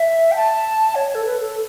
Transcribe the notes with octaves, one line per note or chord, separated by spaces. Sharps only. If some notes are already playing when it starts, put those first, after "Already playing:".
Already playing: E5
G5
A5
C#5
A4
B4
A4